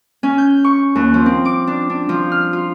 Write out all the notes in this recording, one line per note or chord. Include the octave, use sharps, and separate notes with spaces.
C#4
G6
C#6
D#2
F3
C4
D6
D4
D4
F3
F6
F4